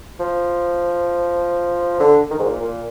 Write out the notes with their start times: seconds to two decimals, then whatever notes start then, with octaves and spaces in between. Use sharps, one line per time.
0.20 F3
2.00 D3
2.31 D#3
2.39 G#2
2.46 A#2
2.60 A#2